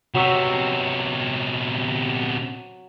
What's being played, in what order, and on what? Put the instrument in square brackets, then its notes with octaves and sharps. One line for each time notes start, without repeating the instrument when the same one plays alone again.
[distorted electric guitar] C3 B3 [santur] F#3 C#6 E6